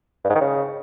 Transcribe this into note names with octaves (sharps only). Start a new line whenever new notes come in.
G2
G#2
D#3
C#3